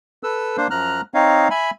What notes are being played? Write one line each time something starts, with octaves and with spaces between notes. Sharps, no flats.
A4 B4 E6
A#3 D4 C5
F#2 F3 A#5 F6 F#6
C4 D#4 C#5 D#5 F5
E5 G#5 B5